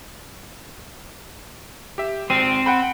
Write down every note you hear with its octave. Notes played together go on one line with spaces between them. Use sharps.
G4 E5
G#1 C4 D#7
F#5 G5 B5